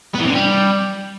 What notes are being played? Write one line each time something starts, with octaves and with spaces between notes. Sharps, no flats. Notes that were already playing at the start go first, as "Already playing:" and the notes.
B3
E3
C3
D3
G3